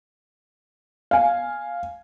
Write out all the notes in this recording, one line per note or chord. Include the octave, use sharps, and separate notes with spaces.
F5 G#5